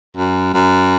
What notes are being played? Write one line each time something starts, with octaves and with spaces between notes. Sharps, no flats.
F#2
F#2